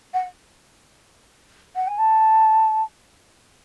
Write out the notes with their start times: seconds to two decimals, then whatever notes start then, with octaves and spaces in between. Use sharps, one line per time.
0.13 F#5
1.75 F#5
1.87 G#5
1.98 A5